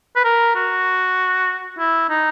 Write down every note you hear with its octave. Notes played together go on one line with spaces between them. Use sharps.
B4
A#4
F#4
E4
D#4